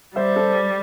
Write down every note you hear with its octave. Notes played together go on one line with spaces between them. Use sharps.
G3 C5 E5
A4 C5